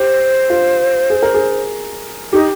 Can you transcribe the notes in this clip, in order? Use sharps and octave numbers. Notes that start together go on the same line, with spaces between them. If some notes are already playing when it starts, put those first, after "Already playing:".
Already playing: G4 C5
F4
G#4
A#4
G#4
D#4 G4